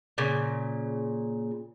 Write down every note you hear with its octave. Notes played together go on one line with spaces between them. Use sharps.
A#2 C#3